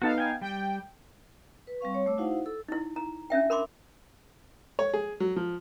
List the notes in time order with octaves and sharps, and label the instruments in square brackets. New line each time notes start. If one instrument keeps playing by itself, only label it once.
[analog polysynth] B3 D#4 F5 [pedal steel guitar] F#4 A4 A5
[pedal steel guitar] G5 G#5
[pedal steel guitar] G3 [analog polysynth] G5
[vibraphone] B4
G3 C4 F5 C#6
C#5
A3 D6 E6
D#4 E4 F#4 C5 F5 F#5
A4 E6
[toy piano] D#4 E4
A#5
C#4 D4 E5 G5
A#4 B5 C6 D6
[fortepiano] C#5
G#4
F#3
F3